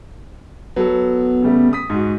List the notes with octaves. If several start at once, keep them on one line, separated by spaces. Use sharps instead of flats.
F#3 B3 A4
C#3 G3 A3
D#6 B6
G#2 F#4